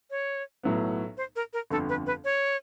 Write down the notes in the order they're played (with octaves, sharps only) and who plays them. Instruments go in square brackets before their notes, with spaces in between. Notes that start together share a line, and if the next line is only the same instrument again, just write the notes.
[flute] C#5
[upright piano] B1 A2 F#3 B3
[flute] C5
A#4
A#4
[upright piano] G1 F2 D3 [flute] A4
[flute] B4
B4
C#5